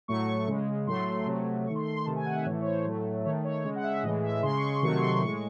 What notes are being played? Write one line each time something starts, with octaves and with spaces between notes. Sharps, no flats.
A2 F#3 A3 C#6
C#3 G#3
A2 F#3 A3 C6
C3 F#3 A3
D#3 A3 C#6
C6
C6
C6
C3 D#3 A3 A5
G#5
F#5
E5
A2 E3 A3 C#5
C#5
C5
A2 F#3 A3
D#3 A3 C#5
C#5
C#3 G#3 C#5
F#5
E5
A2 E3 G#3 D#5
E5
C#3 G#3 C6
C#6
C6
C3 D#3 F#3 A3 C#6
C6
A2 G#3 C#6